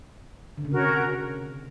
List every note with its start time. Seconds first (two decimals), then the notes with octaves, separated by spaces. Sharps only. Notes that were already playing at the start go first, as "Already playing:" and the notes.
0.58 D3
0.65 C#3
0.72 C3 C#4 F#4 A#4